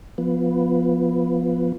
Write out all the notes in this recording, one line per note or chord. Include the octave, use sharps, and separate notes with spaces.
F3 B3